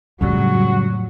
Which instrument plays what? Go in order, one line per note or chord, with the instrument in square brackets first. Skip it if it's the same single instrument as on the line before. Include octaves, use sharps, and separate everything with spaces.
[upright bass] F2 A2 [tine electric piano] C#3 G3 [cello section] F#3 [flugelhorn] F#4